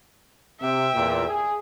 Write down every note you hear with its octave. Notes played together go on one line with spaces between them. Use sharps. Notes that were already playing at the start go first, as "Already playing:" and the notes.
C3 E5 G5
E2 A#2
G#4